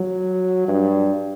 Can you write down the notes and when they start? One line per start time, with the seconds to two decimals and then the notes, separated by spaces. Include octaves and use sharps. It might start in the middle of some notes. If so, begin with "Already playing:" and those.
Already playing: F#3
0.68 G2